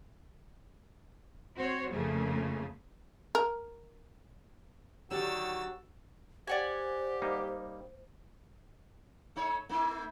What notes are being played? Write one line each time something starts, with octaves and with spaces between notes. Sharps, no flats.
C4 F#4 C5 C#5
F2 C#3 A3 A#3 G#4
A#4
D3 D#3 F#3 F#4 G4 E6 A6
G4 C5 D5 F#5 G#5
G3 A#3 D#4
A3 D#4 C#5
A3 D#4 E4